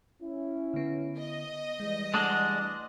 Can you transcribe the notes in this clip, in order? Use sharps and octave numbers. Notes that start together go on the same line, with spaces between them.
C#4 E4
D3 B3
D#5
E3 G3 G#3
G#3 A3 D4 F#5 F#6